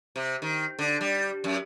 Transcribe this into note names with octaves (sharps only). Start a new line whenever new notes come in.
C3
D#3
D3
G3
F#2